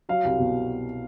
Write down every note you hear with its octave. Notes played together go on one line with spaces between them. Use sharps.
F#3 F5
C2
B2